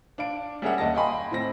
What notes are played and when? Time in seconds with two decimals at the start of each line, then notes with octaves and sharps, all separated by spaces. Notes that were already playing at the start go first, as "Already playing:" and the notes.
0.18 D4 F5 D7
0.62 G3 C#4 G#4 A#4 E5 F#5
0.78 D#2 D#5 F#5 A5 A#6
0.94 D#5 F5 G5 G#5 B5 C6
1.31 A2 C4 A#6